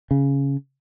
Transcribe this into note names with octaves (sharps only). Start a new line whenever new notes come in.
C#3